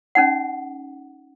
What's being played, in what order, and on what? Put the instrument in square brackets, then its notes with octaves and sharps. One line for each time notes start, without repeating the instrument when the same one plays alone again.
[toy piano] C#4 D#4 F#5